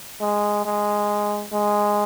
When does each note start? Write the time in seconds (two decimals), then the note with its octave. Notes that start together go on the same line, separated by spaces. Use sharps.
0.21 G#3
0.65 G#3
1.53 G#3